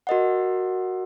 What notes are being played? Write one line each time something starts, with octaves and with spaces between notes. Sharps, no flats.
F#4 A#4 D#5 F#5